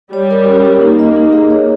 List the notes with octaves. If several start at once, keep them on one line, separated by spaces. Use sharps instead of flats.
G3 C#5
A#4
C#4
G4
A#3 D#4
D#5
D#4
G#4
C#5